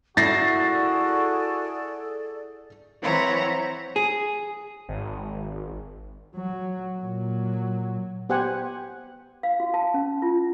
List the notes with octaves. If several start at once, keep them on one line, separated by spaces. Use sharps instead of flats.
E4 F#4 G#4 A4 D5 A6 A#6 C7
E3 C4 C5 C#5 F#5 A#5
G#4
G#1
F#3
A#2 F#3
B3 G4 C5 F#5 G#5
F5
F#4
A5
C#4
F4